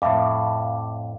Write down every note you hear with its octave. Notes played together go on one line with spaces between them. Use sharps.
F2 A2 E5 F5 D6